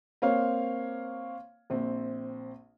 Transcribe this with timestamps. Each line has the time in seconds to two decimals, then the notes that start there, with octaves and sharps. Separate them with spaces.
0.22 A#3 C4 C#5 F5
1.70 A#1 C4